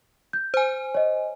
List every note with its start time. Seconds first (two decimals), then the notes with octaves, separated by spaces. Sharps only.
0.33 G6
0.54 C5 G#5
0.94 C#5 D#5